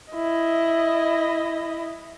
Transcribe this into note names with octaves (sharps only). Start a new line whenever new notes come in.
E4 D#5